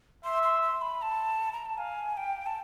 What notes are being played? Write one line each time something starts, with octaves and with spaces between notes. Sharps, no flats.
E5 C6
C6
C6
B5
A5
A#5
A5
F5 G#5
G5
A5